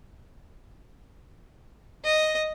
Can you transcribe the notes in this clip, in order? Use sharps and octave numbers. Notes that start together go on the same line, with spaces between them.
D#5